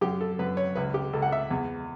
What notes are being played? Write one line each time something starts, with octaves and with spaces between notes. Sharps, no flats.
F#2 G4
A4
F#2 B4
C#5
C#2 B4
G4
C#2 A4
F#5
E5
E2